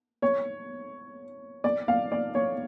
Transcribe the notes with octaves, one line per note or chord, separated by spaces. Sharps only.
C#5
D5
F5
D5
C#5